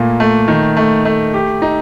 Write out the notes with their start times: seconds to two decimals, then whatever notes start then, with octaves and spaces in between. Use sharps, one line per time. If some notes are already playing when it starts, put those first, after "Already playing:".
Already playing: A#2 A3 A#3
0.20 A3
0.48 D#3
0.77 A3
1.05 A3
1.34 G4
1.62 D#4